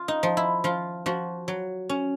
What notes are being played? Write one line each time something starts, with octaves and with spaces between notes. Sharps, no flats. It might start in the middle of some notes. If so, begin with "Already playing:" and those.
Already playing: F4
D#4
F3
E4
F3 F4
F3 F#4
F#3
C#4